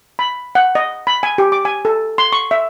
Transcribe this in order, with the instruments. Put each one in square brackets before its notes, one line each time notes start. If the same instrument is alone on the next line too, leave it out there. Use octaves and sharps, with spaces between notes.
[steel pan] B5
F#5
D#5
B5
G#5
G4
D6
G#5
A4
C6
C#6
E5